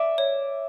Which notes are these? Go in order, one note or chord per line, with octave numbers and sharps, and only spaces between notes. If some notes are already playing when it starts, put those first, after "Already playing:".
Already playing: D5 E5
C#5